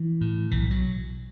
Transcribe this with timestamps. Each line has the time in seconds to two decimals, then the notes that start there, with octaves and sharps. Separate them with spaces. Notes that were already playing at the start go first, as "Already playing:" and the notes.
Already playing: E3
0.21 A2
0.51 B1 E3
0.71 F#3